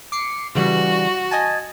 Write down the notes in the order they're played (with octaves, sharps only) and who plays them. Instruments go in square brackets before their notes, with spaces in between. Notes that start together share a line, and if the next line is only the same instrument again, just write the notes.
[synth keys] D6 C7 C#7
[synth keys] C#3 E3 G3 [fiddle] F#4
[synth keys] D#5 G#5 A5